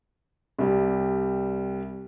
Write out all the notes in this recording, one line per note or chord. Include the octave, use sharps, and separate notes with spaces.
C2 G3